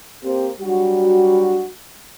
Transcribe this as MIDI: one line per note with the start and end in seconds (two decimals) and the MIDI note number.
0.24 0.49 58
0.24 0.49 60
0.24 0.49 67
0.24 0.49 72
0.61 1.66 54
0.61 1.66 55
0.61 1.66 62
0.61 1.66 66